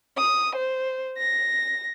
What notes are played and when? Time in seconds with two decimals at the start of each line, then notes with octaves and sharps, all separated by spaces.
0.18 D#6
0.56 C5
1.18 A#6